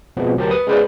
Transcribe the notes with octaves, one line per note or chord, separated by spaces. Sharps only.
B2 F3 G#3 B3 C4
D2 F#3 G4 A#4 C5 A5
B4 D#6
G#3 C#4 G#4 B4 C5 D5